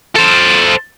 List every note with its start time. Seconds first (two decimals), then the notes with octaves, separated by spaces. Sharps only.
0.16 A4 C5